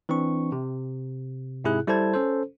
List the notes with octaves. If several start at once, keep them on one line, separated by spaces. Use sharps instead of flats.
E3 C4 D4 C#6
C3
G#2 C3 E4 G#4 F#6
G3 E4 A4 C5 A5 G#6
C#4 A4 C5